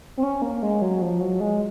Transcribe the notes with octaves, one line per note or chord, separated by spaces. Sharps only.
C4
C#4
A#3
G#3
F#3
F3
F#3
G#3